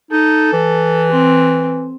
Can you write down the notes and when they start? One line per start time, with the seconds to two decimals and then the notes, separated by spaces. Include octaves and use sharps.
0.11 D#4 A4
0.53 E3
1.11 C4